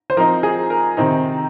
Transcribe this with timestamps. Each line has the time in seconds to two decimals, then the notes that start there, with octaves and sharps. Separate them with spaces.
0.10 C5
0.17 F3 C4 D#4 A#4
0.43 G#4
0.70 A#4
0.97 C3 D#3 C4 D#4